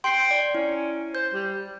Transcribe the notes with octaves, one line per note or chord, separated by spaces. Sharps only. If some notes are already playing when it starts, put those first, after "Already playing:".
G5 C6 C7
D5
C#4 E4
C5 G6
G3